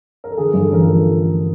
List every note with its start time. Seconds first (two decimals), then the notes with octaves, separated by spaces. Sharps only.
0.24 A#4
0.31 A4
0.37 D3 G#4
0.53 G2
0.61 A4
0.69 A1 A#4
0.84 F3 A4